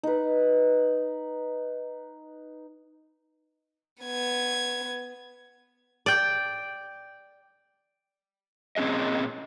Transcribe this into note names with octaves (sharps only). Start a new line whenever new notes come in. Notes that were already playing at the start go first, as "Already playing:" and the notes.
D#4 B4
B3 G#6
D5 G5
A#2 C4 C#4 G#4 D#5